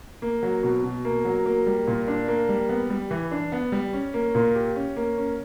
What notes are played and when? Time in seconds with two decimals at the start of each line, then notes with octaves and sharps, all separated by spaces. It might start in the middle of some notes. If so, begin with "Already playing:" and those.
0.22 A#3
0.43 F#3
0.63 B2
0.84 B2
1.05 A#3
1.25 F#3
1.46 A#3
1.66 G3
1.87 A#2
2.08 D4
2.28 A#3
2.49 G3
2.69 B3
2.90 G3
3.11 E3
3.31 D4
3.52 B3
3.72 G3
3.93 C#4
4.14 A#3
4.35 A#2
4.55 G4
4.76 C#4
4.97 A#3
5.18 C#4